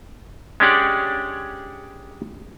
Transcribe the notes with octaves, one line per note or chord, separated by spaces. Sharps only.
G#3 C#4 D4 G4 D5 F#5